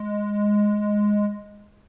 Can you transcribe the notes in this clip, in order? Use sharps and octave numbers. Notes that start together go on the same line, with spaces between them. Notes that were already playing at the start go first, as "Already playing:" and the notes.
Already playing: G#3